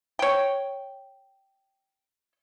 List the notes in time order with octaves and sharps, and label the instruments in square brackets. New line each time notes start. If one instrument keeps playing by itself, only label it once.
[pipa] C#5 G5